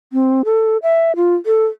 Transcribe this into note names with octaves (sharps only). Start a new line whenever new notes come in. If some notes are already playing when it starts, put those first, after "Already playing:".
C4
A4
E5
F4
A4